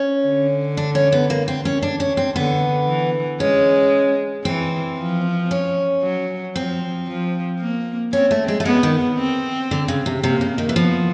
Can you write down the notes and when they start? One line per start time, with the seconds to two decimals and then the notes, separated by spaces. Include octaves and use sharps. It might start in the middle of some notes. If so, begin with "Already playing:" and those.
Already playing: C#4
0.25 D3
0.77 D4
0.95 C#4
1.12 B3
1.30 A#3
1.48 C4
1.65 C#4
1.82 D4
2.00 C#4
2.17 C4
2.36 D3 B3
2.87 E3
3.40 G#3 C#4
4.45 E3 C4
4.98 F3
5.51 C#4
6.03 F#3
6.56 F3 C4
7.08 F3
7.60 A#3
8.13 C4 C#4
8.31 A3
8.48 G#3
8.60 A3
8.65 G#3 B3
8.83 D#3
9.18 C4
9.71 D3
9.88 C#3
10.06 C3
10.23 C3 A#3
10.41 C#3
10.58 D#3
10.69 E3
10.76 F3 B3